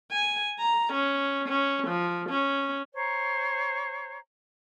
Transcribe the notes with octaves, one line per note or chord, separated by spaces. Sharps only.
G#5
A#5
C#4
C#4
F3
C#4
C5 C#5 A#5